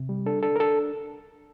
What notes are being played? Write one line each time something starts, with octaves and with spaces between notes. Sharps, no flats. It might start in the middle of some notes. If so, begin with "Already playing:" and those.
Already playing: C3
G3
D4 A4
D4 A4
A#4
D4 A4